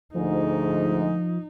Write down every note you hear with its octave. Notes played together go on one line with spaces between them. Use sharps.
D2 G#2 F3 D#4